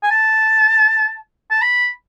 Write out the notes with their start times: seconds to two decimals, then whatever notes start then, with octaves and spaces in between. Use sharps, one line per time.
0.03 G#5
0.11 A5
1.51 A5
1.62 B5